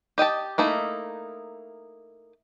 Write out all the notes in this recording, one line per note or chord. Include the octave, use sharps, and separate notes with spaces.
G4 D#5 G5 A5
A3 A#3 D#4 E4